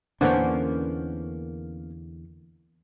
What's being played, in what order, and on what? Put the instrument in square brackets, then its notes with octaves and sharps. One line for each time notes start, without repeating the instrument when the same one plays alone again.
[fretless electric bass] E2 D3 [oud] A#3 B3 C#4 [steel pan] D4 C5 F#5